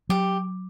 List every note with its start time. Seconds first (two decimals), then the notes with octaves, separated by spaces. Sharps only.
0.09 F#3 G4